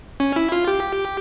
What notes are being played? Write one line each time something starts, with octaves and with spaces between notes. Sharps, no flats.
C#4
E4
F4
G4